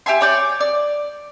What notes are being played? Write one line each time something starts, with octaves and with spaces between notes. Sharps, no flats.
G4 E5 G#5 C6
C#5 D5 G6
D5